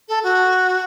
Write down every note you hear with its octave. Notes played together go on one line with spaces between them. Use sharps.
A4
F#4